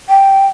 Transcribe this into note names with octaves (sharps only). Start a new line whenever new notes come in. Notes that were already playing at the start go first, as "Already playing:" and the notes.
G5